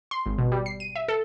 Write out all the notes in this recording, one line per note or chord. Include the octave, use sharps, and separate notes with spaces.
C6
G#1
B2
G3
C7
D#7
E5
A4